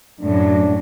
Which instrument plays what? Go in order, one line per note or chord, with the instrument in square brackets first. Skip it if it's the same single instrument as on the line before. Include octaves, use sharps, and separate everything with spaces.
[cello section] F#2 A2 F#3 [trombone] D4